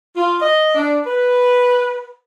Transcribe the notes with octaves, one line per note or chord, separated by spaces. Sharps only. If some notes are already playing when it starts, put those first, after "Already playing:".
F4
D#5
D4
B4